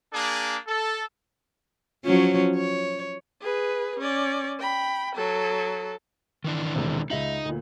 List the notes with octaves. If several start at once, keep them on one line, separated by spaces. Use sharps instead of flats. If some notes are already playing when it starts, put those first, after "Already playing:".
A#3 D4 G#4
A4
F3 F#3 C#4
C#5
G#4 B4
C#4 D5
G5 B5
F#3 A4
D#3 E3 D4
E1 C3
C#2 D#4 D#5 E5 F#7
D2 A#2